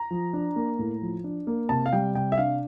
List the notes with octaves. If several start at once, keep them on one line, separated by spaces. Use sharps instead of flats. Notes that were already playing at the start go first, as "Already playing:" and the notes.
Already playing: A#5
F3
D4
A#3
A2
F3
D4
A#3
C3 A5
F5
G3 G5
C3 G5
E5
D4 F5